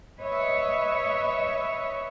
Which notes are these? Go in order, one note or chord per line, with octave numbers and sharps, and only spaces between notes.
B4 C#5 D#5 E5